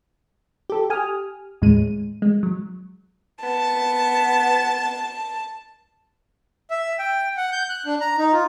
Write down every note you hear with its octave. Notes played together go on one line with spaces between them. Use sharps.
G4 A4
G4 G#5 D#6 F6
D#2 A2 G#3 D#7
G#3
F#3
B3 A5
E5
G5
F#5
G6
F#6
D4
A#5
D#4
F4